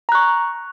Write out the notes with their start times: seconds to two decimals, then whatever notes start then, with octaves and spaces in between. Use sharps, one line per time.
0.09 A#5
0.12 F#6
0.15 C#6